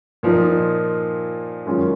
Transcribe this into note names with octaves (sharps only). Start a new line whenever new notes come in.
A#2 F3 A#3 D#4
F#2 D#3 G#3 C#4 F4